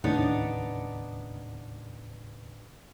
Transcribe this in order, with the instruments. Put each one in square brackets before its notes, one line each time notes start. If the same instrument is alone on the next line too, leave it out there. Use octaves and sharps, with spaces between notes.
[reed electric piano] D#2 A2 C#3 [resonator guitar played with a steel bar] B3 D4 D#4